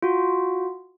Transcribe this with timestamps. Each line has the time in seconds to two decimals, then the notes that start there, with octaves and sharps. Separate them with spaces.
0.02 F4 F#4